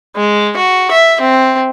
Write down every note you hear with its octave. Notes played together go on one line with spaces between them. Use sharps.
G#3
F#4
E5
C4